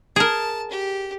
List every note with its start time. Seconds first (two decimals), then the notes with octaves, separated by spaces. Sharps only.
0.16 G#4 A#4 A5
0.71 G4